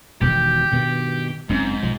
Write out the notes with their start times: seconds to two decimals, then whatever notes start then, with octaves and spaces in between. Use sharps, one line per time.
0.21 E1 B2 D#3 G4
0.72 G2 B2 D#3
1.49 F#1 G#2 C4 C#4
1.83 B1 F3